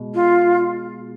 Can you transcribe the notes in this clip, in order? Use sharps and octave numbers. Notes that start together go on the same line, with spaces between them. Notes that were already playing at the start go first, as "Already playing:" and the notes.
Already playing: B2 G#3
F4